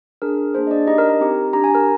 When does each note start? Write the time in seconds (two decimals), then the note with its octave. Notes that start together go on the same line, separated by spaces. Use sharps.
0.22 D4 G#4 A#4
0.54 A#3 D4 G#4 C5
0.67 D#5
0.71 D4 D5
0.87 D#4 G4 D#5
0.90 D4
0.98 A#4 A#5
1.09 A#4 A#5
1.20 C4 D#4 G4
1.53 D4 G4 A#5
1.64 G#5
1.75 A#4 A#5